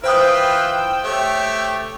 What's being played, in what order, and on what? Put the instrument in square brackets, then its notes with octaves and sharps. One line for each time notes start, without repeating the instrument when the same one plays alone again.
[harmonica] E3 F4 B4 [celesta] C5 D#6 [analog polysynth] G5 E6
[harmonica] A3 G4 C#5